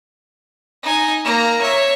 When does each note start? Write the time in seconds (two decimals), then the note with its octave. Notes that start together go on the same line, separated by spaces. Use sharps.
0.83 D#4 G#5
1.24 A#3 A#5
1.62 C#5 E5